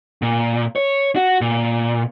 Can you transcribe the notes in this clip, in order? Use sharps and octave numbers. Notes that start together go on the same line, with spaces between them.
A#2
C#5
F#4
A#2